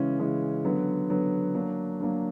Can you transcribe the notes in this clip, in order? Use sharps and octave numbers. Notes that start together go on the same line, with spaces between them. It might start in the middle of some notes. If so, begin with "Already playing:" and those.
Already playing: C#3 E3 G#3 C#4
C#3 E3 G#3 C#4
D3 F#3 B3
D3 F#3 B3
F#3 A#3 D4
F#3 A#3 D4